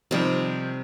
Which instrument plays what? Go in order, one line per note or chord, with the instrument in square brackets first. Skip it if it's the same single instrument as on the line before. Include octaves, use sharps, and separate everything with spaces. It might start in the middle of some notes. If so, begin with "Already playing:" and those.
[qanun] C3 G3 [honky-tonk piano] D#3 F3